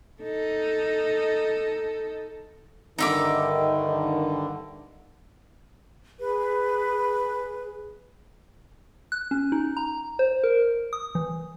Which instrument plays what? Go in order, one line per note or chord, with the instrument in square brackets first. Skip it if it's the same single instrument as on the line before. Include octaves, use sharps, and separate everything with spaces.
[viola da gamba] D#4 A4
[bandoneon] G2 D3 [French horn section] D#3 [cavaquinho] D#4 E5 D6
[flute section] G#4 B4
[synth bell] F#6
C#4
D#4
A#5
C5
A#4
D#6
E3